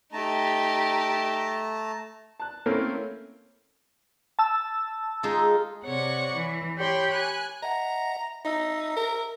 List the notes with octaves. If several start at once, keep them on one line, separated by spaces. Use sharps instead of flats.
A3 D#4 G4 A5 A#5
A5 F#6
A3 A#3 C4 C#4 E4 A#4
A5 E6
G#3 D#4 F4
C3 C#5 D5 F#5 C#6
E3
G4 C#5 G5 B5 C6
G#5 F#6
D#5 E5 F#5 A#5
D#4 E5 E6
A#4